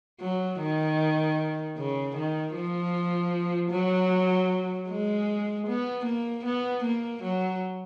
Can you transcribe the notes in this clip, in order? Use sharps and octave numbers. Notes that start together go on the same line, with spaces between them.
F#3
D#3
C#3
D#3
F3
F#3
G#3
B3
A#3
B3
A#3
F#3